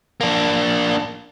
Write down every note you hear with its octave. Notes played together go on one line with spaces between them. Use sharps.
A#3 D4